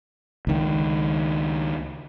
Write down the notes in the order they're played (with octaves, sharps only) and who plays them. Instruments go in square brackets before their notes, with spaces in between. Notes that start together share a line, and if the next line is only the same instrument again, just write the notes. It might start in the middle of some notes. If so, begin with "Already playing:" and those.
[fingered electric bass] C#2 D#3